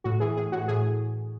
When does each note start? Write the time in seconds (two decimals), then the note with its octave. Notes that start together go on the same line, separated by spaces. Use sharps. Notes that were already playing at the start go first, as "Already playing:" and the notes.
0.04 A2 F#4
0.20 E3 G#4
0.37 A2 G#4
0.52 A2 F#4
0.68 A2 G#4